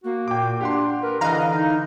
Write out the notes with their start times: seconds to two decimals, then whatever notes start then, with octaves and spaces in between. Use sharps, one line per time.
0.04 A#3 F#4
0.28 A#2 G5 D6
0.61 D4 G4 F#5 C6
1.02 A#4 B4
1.21 D3 E3 D#5 F5 A#5 F#6
1.54 D#4